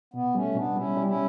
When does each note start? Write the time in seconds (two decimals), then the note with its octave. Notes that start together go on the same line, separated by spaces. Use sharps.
0.14 B2 B3
0.35 G3 A3 C#4
0.55 B2 B3 D4
0.76 G3 C#4 E4
0.97 G3
1.07 C#4 E4